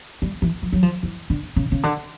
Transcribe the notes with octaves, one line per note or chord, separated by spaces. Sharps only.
G3
E3
F3
F#3
F3
E3
D3
C#3
C#3
D3